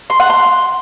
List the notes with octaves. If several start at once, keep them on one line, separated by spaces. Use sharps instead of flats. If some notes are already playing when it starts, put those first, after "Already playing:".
C6
F#5
C6